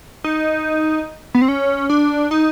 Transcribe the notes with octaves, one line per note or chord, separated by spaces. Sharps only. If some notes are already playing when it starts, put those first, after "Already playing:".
D#4
B3
C4
C#4
D4
D#4